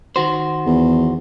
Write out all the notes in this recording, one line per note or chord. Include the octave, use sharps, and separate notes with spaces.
D#3 F#4 C5
E2